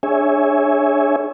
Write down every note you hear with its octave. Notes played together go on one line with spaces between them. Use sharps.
D4 G#4 C#5 E5 G#5